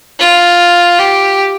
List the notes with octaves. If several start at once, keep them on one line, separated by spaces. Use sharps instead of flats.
F4
G4